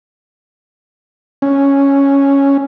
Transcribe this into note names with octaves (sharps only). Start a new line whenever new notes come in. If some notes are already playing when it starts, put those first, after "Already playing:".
C#4